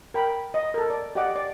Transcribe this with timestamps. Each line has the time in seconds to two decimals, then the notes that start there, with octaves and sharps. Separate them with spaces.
0.14 A#4 G5 B5
0.54 D#5
0.74 A4 A#4
0.90 D5
1.15 G4 D5 D#5 F#5 D6
1.36 D5